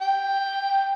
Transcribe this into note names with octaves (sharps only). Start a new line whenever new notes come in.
G5